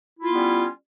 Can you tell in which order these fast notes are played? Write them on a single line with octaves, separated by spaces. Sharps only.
E4 F4 B3 G3 C#4